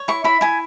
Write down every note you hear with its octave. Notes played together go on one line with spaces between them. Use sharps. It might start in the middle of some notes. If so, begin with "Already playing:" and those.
Already playing: C#5
E4 C#6
E4 B5
E4 G#5